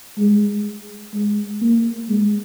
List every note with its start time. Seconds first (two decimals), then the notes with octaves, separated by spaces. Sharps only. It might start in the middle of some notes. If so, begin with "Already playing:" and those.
0.18 G#3
1.14 G#3
1.61 A#3
2.09 G#3